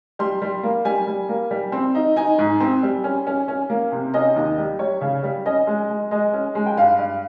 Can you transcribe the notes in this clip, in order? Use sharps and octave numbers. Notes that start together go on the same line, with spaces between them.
G3 C6
G3
A#3
G3 G#5
G3
A#3
G3
C4
D#4
D#4 G#5
G#2
C4
G3
C#4
C#4
C#4
A#3
C3
C#4 D#5
D#2
G3
G3 C#5
C#3
G3
C#4 D#5
G#3
G#3
G#3 D#5
C#4
G#3
G5
G2 F5
G2